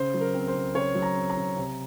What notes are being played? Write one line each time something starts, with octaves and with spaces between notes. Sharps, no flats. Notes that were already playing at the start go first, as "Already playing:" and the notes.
Already playing: C#3 C5
F#3
A#4
C4
C5
C#3
C#3 C#5
F#3
A#5
C4
A#5
C#3
C3